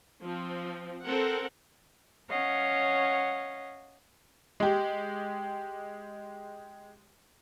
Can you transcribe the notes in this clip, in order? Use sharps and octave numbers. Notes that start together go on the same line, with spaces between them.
F3 C4
C4 A4 A#4 F#5
C#4 C#5 D#5 F5 F#5
G#3 G4